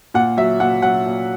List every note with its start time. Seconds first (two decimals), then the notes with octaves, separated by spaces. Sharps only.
0.14 A#2 F#5
0.37 F#3 E5
0.60 A#2 F#5
0.82 F#3 F#5
1.06 A#2